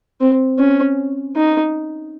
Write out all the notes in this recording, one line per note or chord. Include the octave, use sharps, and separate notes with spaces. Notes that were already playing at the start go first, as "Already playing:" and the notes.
C4
C#4
D#4